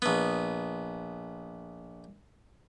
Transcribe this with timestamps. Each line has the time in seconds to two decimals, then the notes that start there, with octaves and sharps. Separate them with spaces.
0.02 A#1 B3